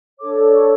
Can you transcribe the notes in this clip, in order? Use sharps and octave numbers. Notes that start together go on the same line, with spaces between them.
D4 A4 C#5 D6
C#6